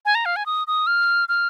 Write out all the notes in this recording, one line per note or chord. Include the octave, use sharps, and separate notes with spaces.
G#5
A#5
F5
G#5
D#6
D#6
F6
F6